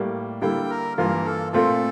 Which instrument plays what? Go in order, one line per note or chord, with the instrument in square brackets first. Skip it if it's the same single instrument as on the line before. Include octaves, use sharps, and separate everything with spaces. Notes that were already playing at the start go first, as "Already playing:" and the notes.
Already playing: [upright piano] A2 G3 A#3
[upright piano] D3 G3 A#3 E4 [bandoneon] G5
[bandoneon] A#4
[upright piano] G2 E3 A#3 F4 [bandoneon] A#4
[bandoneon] A4
[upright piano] A#2 A3 C4 F4 [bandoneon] A4